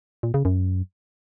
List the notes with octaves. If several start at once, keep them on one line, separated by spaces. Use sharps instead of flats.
A#2
C#3
F#2